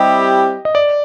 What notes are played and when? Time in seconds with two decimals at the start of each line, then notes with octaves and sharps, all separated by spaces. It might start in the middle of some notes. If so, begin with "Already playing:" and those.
Already playing: G3 C4 E4 G4 D#5
0.65 D#5
0.75 D5